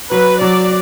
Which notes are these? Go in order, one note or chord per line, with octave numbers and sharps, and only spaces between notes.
F#3 B4
F#3 D5